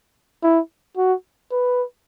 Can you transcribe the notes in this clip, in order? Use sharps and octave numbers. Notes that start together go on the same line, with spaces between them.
E4
F#4
B4